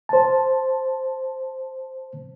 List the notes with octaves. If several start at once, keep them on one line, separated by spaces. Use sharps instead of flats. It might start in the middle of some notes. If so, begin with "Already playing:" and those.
C5 A5